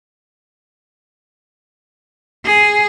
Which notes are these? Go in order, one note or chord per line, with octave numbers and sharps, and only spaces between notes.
G#4